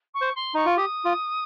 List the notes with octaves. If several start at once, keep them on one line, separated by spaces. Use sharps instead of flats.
C#6
C5
C6
D#4 C#6
F4
G4 D#6
F4